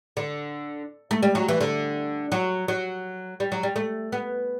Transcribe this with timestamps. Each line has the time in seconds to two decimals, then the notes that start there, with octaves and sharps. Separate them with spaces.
0.17 D3
1.11 A3
1.23 G3
1.35 F#3
1.48 E3
1.61 D3
2.32 F#3
2.68 F#3
3.40 G3
3.52 F#3
3.63 G3
3.76 A3
4.12 B3